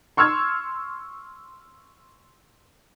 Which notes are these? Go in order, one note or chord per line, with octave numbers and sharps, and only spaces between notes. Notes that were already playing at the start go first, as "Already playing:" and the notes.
C6 C#6 E6 F6 G#6